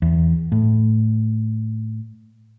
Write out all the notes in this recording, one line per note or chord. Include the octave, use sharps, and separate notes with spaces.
E2
A2